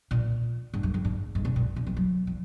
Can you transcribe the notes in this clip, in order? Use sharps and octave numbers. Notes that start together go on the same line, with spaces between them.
A#2
G#2
F#2
F2
G#2
G#2
B2
A#2
B2
F3
F#3
F3